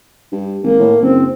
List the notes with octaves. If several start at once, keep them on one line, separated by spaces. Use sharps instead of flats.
G2
G#1 A#3
A2
F#1 C4